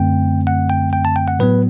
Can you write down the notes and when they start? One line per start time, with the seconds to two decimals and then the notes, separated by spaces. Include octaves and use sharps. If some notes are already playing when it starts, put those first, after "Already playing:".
Already playing: F#2 D3 A3 C4 G5
0.47 F#5
0.70 G5
0.93 G5
1.05 A5
1.16 G5
1.28 F#5
1.39 A2 F#3 B3 B4